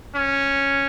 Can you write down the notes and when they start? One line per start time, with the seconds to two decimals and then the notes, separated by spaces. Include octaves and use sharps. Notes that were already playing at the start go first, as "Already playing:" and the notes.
0.15 C#4